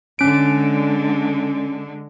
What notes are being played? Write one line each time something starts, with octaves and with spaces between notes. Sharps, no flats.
D3 G#3 C#4 D7